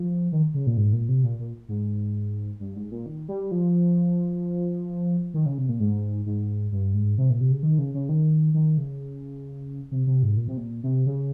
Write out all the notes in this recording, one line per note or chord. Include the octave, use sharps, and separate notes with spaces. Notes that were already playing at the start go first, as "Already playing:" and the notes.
Already playing: F3
D#3
C#3
A#2
G#2
A#2
C3
A#2
A#2
G#2
G2
G#2
A#2
D#3
G3
F3
D#3
C#3
C3
A#2
G#2
G#2
G2
G#2
C3
A#2
C3
C#3
D#3
C#3
C#3
D#3
D#3
C#3
C3
C3
G#2
A#2
C3
A#2
C3
C#3